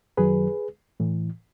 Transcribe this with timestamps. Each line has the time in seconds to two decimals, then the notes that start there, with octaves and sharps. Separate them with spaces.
0.17 F#2 D#3 F#3 G#4 B4
1.00 A2 E3